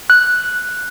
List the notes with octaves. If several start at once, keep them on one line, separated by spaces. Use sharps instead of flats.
F#6